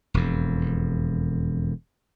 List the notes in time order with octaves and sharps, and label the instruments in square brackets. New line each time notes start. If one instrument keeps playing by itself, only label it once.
[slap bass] E1 F2